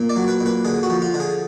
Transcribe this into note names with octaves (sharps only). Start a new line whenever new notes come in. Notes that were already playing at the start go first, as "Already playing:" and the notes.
Already playing: A#2
D5
F#3
B4
A#2
B4
D3 G#4
F#4
F3
F4
D3
G#4